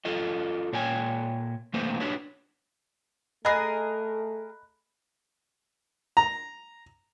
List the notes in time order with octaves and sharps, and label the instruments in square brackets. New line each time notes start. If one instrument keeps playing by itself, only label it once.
[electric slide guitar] F4 F#4 A4 D#5
A#2 C#5 G5 G#5
E3 A3 A#3 D#4 B4 C5
D4 F#4 G4 B4 C#5
[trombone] A3 [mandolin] G#4 A#4 [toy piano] D#5 [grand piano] B5 F#6 A#6
[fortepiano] A#5